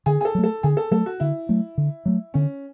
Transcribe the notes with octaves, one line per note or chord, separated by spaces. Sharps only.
D3 G#4
G#4
A4
F#3 A3
A4
D3 G#4
A4
F#3 A3 A4
F#4
D3 E4
F#3 A3
D3
F#3 A3
D3 C#4